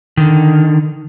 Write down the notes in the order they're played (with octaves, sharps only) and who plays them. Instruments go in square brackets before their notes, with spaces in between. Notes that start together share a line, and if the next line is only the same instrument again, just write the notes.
[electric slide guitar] D3 D#3